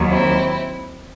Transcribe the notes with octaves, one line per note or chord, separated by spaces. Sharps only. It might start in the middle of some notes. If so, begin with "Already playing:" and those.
Already playing: D#2 D#3 F#3
C4 E4